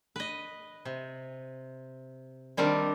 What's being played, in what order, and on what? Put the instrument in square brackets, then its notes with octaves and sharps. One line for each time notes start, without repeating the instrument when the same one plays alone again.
[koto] B4 D#5
C3
D#3 G3 C4 D4 A#4